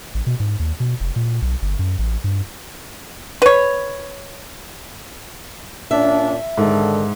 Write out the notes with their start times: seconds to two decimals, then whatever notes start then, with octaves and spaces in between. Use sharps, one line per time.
0.14 A1
0.27 B2
0.40 G#2
0.59 D#2
0.80 B2
1.00 F1
1.16 A#2
1.42 B1
1.62 G1
1.79 F#2
1.99 A1
2.24 G2
3.42 B4 C#5
5.91 A#2 C#4 D4 E5
6.57 G#2 D3 D#3 A4